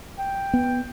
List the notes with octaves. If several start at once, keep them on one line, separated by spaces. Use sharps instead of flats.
G5
B3